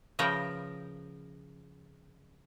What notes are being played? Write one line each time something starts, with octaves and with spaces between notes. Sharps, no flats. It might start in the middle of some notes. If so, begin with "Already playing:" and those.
C#3 F3 A#4 B4 E5 G5